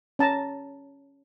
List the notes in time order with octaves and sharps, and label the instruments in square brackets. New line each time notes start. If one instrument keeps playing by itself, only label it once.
[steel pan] C#4 A5 A#5